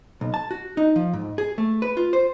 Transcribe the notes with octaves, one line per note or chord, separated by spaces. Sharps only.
B1
A5
F#4
D#4
F3
G#2
G#4
A3
B4
F4
C5